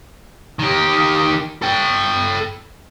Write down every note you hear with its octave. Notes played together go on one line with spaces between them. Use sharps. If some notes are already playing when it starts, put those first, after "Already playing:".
D#3 G4
A4 G5